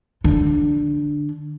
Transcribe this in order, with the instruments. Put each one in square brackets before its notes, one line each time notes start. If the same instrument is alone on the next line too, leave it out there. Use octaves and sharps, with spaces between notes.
[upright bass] D3